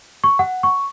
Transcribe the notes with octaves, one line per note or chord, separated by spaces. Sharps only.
C#6
F#5
C#6